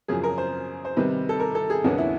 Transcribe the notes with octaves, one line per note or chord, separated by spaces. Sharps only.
F#2 C#3 F3 G#4
A#4
C5
C5
C3 D#3 G3 B4
A4
A#4
A4
G#4
D#2 C#3 F#3 B3 D4 F#4
E4